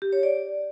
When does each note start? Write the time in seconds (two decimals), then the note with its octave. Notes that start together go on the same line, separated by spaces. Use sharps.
0.02 G4
0.13 C#5
0.23 D5